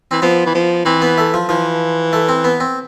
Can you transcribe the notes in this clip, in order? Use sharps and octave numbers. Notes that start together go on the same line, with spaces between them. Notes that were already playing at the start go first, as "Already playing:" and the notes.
E3 C4
F3 B3
E3
F3
E3 C4
B3
A3
F3
E3 F3
A3
C4
B3
C4